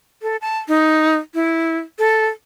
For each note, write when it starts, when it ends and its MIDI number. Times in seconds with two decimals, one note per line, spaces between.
0.22 0.37 69
0.41 0.58 81
0.69 1.15 63
1.34 1.78 64
1.99 2.27 69